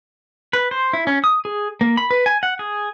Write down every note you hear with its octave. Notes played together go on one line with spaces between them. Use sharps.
B4
C5
E4
C#4
D#6
G#4
A#3
B5
B4
G#5
F#5
G#4